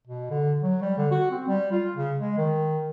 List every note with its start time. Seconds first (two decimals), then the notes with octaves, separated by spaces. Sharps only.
0.07 B2
0.31 D3
0.63 F#3
0.82 G3
0.98 D3
1.11 F#4
1.31 C4
1.48 G3
1.72 F4
1.97 C#3
2.18 G#3
2.38 D#3